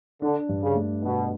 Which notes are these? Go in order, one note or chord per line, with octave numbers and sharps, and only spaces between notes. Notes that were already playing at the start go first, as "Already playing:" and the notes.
D3 D4
G2
C#3
A3
B2 D4